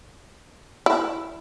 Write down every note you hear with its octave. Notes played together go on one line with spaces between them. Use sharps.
E4